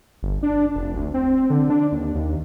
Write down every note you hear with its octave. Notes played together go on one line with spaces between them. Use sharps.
G1
D4
F1
D2
C4
D3
D4
D#2
D#2